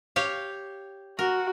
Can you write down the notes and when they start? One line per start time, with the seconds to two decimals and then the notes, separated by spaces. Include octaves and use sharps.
0.16 G4 C#5 F5
1.19 F#4 A#4